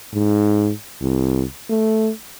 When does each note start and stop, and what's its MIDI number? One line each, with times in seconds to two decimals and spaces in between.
0.14 0.71 44
1.01 1.43 36
1.70 2.11 57